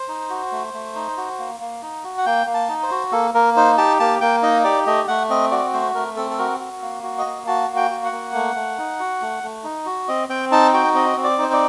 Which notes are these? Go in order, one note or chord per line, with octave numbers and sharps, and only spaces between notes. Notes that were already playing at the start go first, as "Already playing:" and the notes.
Already playing: C5
D#4
F#4
A3
A3
D#4
F#4
A#3
A#3
D#4
F#4
F#5
A#3 G5
A#3
A5
D#4
C5
F#4
A#3 A4
A#3 A#4
D#4 C5
G4 A5
A#3 A5
A#3 G5
D#4 D#5
G4 D5
A3 D#5
A3 F#5
C4 D#5
F#4 D5
A3 C5
A3 A#4
C4 A4
A4
F#4 A#4
F#4
A#3
F#4
D#5
A#3
F#4 A5
A#3
G5
F#4
F#5
A#3
A3
A3
D#4
F#4
A3
A3
D#4
F#4
C4 D#5
C4 G5
D#4 A5
F#4 G5
C4 D#5
C4
D5
D#4 C5
D5